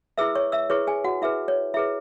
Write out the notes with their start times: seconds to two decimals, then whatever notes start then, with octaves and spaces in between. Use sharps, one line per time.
0.18 E4 G#4 B4 E5 E6
0.35 C#5 C#6
0.52 E5 E6
0.70 E4 G#4 B4 C#5 C#6
0.87 G#4 G#5
1.04 F#4 F#5
1.22 E4 G#4 B4 E5
1.48 C#5
1.74 E4 E5
1.77 G#4 B4